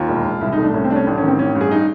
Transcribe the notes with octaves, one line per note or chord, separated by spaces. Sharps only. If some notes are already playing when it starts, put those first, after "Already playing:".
Already playing: D#2 F4
E1
E1
C2 E4
D#4
A3
D4
C2 C#4
C4
A3 D4
C#4
A1 D4
C#4
D#3
C4
A1 C#4
G2
G#4
D#4